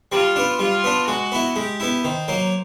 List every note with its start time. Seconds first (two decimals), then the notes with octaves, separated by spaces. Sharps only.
0.12 G3 F4
0.36 B3 D4
0.59 G3 F4
0.84 B3 D4
1.08 G#3 F#4
1.32 B3 E4
1.56 G#3 G4
1.80 B3 E4
2.04 D#3 C5
2.28 F#3 A#3